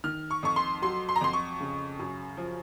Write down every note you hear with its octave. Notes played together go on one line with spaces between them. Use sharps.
D#3 F6
C#6
F2 C#6
C6
F#3 C6
C6
A#5
F2 C6
C#6
C#3
F#2
F3